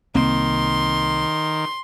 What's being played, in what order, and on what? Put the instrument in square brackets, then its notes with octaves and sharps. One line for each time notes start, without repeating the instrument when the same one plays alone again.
[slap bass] C2 A#3 C4 [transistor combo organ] D#3 [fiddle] C6